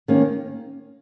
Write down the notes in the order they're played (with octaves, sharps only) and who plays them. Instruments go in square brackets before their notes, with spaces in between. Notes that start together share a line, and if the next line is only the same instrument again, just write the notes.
[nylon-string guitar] D#3 A#3 C#4